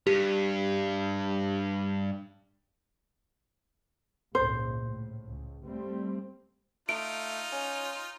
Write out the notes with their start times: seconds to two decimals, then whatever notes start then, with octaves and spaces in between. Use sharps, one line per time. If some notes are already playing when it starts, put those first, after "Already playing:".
0.07 G2 G4
4.35 G#1 C#2 A#2 C5
4.80 A2
5.28 C#2
5.66 G3 A3 C4
6.89 A3 D#4 F4 D7
7.52 C#4